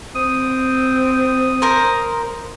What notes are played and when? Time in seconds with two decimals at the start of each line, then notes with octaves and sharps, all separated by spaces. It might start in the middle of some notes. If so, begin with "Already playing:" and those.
0.15 C4 D#6
1.62 A#4 C5